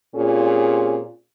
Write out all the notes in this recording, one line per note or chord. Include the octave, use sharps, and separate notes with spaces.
A#2 C4 C#4 F4 G4 G#4